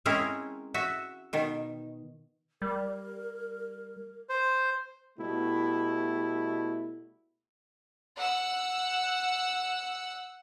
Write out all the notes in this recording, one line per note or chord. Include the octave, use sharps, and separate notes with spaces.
G#3 C4 C#4 E4 G#4 A#4
F#4 E5
B2 D#3
G3 A#4
C5
B2 G3 A3 E4
F#5 E6